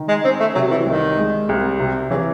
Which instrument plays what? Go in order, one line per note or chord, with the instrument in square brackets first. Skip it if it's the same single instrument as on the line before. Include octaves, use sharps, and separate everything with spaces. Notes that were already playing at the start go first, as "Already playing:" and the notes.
Already playing: [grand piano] D#3
[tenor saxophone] G#3
[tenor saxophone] C4 [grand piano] C#4
[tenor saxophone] A3
[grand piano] C3 [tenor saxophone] F#3
[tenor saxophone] E3
[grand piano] C2 [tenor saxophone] D#3
[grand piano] G#3
C2
C3
[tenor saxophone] C#3 [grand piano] E3